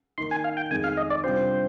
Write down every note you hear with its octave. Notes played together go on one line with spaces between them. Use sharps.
D#3 A#3 D#4 C6
G#5
F5
G5
F2 D#3 G#3 G#5
F5
D#5
D5
C3 G3 D4 F4 C5